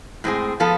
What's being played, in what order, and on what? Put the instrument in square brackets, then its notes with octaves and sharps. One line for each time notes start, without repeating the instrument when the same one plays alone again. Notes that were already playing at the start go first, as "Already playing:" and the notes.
[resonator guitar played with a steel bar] A2 G#3 C4 G#4
F3 B3 F4 A4